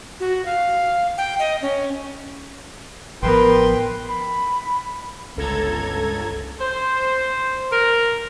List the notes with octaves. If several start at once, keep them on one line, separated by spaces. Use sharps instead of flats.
F#4
F5
G5
D#5
C#4
A1 F3 B3 A#4 B4 G5 C6
B5
G1 C#2 A4 A#5 G#6
C5
A#4